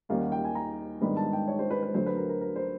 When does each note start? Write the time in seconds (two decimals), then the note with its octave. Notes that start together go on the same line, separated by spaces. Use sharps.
0.09 D#2 D#3 G3 A#3 C#4 F5
0.21 F#5
0.32 G5
0.44 G#5
0.55 A#5
1.01 G#2 D#3 G3 B3 D4 B5
1.17 A5
1.33 G5
1.48 C#5
1.59 C5
1.71 B4
1.83 B4
1.94 D2 D3 F#3 C5
2.06 B4
2.17 A#4
2.29 A#4
2.41 A#4
2.56 C5